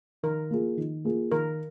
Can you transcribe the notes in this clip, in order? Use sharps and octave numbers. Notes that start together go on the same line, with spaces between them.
D#3 A#4
A#3 F4 G#4
D#3
A#3 F4 G#4
D#3 A#4